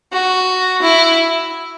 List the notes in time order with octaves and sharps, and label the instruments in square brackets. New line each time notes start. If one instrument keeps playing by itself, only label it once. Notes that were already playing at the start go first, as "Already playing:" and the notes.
[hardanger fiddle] F#4
E4